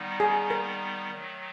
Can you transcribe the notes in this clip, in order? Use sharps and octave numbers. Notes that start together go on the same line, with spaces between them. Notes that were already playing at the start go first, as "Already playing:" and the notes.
Already playing: D#3 G3 B3 D#4
G#4
A#4
D#3 F#3 A3